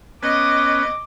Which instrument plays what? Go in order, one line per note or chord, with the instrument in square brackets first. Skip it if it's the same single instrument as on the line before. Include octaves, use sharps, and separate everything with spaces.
[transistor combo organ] B3 C#4 [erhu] D#5 [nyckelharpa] D6